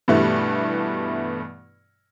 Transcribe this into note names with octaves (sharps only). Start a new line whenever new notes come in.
G2 B2 E3 G3 A3